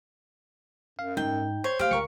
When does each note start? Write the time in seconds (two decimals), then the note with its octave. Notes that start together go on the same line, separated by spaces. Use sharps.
0.99 F#2 F5
1.17 G#2 D#4 G5
1.64 C5 C#5
1.79 A3 G4 F5
1.91 C#2 A#4 C#6 C#7